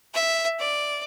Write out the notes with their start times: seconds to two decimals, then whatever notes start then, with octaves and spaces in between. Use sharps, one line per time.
0.14 E5
0.59 D5